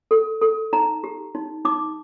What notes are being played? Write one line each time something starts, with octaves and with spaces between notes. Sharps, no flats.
A4
A4
D#4 A#5
G4
D#4
D#4 D6